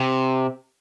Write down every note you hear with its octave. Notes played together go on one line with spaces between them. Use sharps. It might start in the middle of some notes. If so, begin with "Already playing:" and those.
Already playing: C3